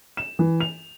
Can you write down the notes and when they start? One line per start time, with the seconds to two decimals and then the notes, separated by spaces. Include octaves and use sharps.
0.17 E7
0.39 E3
0.61 F7